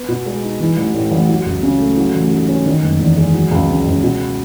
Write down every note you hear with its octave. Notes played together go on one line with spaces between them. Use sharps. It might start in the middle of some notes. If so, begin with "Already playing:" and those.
Already playing: B3
B2
G#3
D#4
E3
A1
A2
A1
F#3
C#2
C#3
A3
F#3
A1
G#2
C#4
D#3
F#1
E2
G#3
F#3
C#2
C#3
C#2
B2